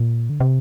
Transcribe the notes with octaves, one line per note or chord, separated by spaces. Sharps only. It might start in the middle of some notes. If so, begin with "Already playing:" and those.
Already playing: A#2
D3
C3